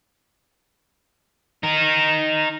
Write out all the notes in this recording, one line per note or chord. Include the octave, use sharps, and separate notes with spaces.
D#4 A#4